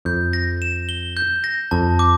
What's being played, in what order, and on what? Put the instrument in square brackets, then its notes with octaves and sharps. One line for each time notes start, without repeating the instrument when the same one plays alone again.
[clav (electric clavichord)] F2 [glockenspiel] G6
[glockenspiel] A#6
E7
G7
G6
A#6
[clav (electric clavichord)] F2 [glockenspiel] A5
[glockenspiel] D6